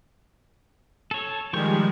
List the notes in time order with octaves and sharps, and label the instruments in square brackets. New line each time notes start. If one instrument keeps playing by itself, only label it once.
[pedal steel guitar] A4 C#5
[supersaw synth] D#3 G3 G#3 [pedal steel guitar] F3 C#6 G6